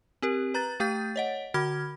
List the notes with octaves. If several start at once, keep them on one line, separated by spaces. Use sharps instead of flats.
C4 G4 A#4
B4 A#5 F#6 A6
A3 G4 G5 G6 A6
C#5 D#5 F#5
D3 F#4 B5 F6 G#6